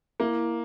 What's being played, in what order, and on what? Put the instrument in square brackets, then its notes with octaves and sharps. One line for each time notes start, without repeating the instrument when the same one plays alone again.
[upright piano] A#3 [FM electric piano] E4